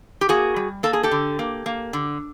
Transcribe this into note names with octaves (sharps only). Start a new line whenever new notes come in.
G4
A#3 F#4 G#4
G3
A#3 A4
G#4
G4 A4
D3
A#3
A#3
D3